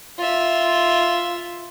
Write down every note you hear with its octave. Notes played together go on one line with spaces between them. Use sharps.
F4 E5